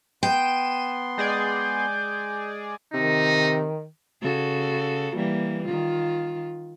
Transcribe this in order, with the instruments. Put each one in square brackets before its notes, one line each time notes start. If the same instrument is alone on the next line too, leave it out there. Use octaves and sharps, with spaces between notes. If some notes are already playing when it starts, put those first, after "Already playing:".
[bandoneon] B3 C6 [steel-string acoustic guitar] G5 [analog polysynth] D#7 E7
[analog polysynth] G#3 G#4 D5 [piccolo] G6
[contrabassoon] C3 [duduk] D#3 [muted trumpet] D#4
[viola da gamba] C#3 F#4 A4
E3 G3 A#3
D#3 F4